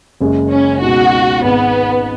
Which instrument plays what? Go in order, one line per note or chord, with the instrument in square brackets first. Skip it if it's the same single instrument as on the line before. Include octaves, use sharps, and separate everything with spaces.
[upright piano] F#1 F#2 C#3 G#3
[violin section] C#4
[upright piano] C#2 B2 G#3 D#4 [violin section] F#4
[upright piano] G#1 G#2 G#3 [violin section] B3